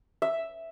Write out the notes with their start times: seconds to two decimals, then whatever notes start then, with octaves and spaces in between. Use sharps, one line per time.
0.22 E5